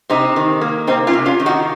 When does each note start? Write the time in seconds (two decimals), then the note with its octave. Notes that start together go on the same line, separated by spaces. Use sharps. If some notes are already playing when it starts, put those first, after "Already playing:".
0.10 C3 C4 D#4
0.36 D#3
0.61 A#3
0.87 C3 C4 D#4
1.07 C#4 F4
1.13 C3
1.26 C#4 F4
1.40 D#3
1.46 D#4 F#4